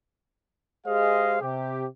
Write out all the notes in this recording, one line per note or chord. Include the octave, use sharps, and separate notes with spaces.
G#3 G4 G#4 C5 D#5 F5
C3 G4